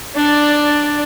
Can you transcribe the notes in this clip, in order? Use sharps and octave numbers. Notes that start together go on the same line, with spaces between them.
D4 D5